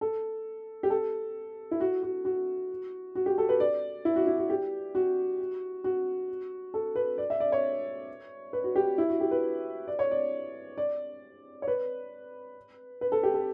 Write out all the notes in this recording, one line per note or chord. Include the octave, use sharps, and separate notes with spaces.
A4
G4
A4
E4
F#4
F#4
F#4
F#4
G4
A4
B4
D5
E4
F#4
E4
F#4
G4
F#4
F#4
A4
B4
D5
E5
D5
C#5
B4
F#4
G4
E4
F#4
G4
B4
D5
C#5
D5
D5
C#5
B4
B4
A4
G4
A4